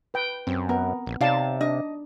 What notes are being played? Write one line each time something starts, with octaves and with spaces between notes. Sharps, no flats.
B4 G5
F#2 C4
B3 A#4
A#1
C3 D#4 C#5 D5 F5 A5
D4 D#5